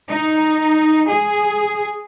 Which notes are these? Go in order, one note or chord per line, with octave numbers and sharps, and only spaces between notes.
D#4
G#4